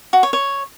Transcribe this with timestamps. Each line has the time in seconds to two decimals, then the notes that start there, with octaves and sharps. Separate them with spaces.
0.13 F#4
0.23 C#5
0.33 C#5